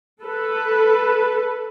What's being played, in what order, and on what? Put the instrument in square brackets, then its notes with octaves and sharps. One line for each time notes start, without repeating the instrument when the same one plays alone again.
[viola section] A4 B4